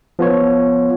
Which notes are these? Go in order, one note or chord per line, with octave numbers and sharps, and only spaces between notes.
F3 B3 F4 C#5